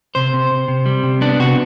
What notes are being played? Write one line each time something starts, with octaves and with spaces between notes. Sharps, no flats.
C3 C5
C3
C3
C3
G3
C3
B3 D4
C3 F#4